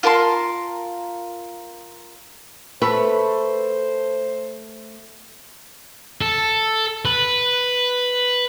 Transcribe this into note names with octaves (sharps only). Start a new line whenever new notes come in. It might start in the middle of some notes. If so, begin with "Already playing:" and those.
F4 A#4 A5 C6
A3 B4 C5
A4
B4